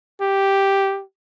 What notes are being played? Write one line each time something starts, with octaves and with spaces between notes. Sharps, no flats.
G4